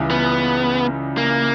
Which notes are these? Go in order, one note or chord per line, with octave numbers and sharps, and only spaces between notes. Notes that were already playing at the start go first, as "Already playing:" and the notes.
Already playing: C#2 C#3 E3 G3
B3
A#3